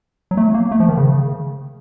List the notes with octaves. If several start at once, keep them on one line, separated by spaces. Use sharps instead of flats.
F#3
A3
A#3
A3
F3
D#3
C#3